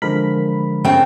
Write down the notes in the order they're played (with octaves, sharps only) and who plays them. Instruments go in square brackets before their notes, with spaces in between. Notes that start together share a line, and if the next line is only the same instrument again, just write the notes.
[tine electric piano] D3 F3 G#3 [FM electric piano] A#4 B5
[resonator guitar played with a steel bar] C#3 A3 [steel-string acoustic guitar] C4 G5